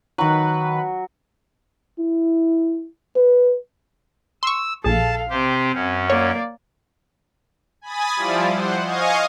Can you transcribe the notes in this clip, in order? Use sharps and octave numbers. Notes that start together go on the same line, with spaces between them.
D#3 F#3 F#4 B4
E4
B4
C6 C#6 E6
A#1 G#4 A4 F5 A5
C3 C4 G4 C5
F#2 C#4
A#3 C#5 D5
G#5 B5 D#6 A6
F3 G3 E4 F4 D5
C5 F#5
D#5 F5 G#5 C#6 D#6